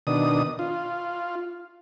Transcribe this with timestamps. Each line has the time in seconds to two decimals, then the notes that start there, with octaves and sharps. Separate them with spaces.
0.07 B2 D#3 D4 D#6
0.59 F4